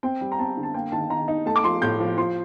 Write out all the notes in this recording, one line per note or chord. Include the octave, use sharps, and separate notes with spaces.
C4 G5
G3
A#5
C4 A5
D3
A5
A#3 G5
D#3 A5
D#3 A#5
D#4
A3 A5
D6
F3 C6
A2 G6
F3
F3 C6